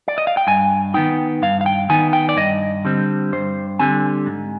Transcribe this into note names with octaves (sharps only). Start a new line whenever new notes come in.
D5
D#5
F5
G5
G2 G#5
D#3 B3 D#4 G5
G2 F5
F5
G5
D#3 B3 D#4 G#5
G5
D5
G2 D#5
D3 G3 C4
G2 C5
D3 G3 C4 G#5
G#2